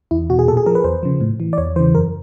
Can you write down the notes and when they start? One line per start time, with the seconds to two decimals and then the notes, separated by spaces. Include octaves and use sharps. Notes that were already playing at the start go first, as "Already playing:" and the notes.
0.11 E2 E4
0.30 B2 F#4
0.39 G#4
0.48 A#2 A4
0.57 G#4
0.66 F3 A#4
0.75 B4
0.84 E2 C5
1.03 C#3 F3
1.21 A2
1.40 E3
1.53 D5
1.58 E2 C#5
1.76 E3 C5
1.80 C#3
1.95 F#2 A#4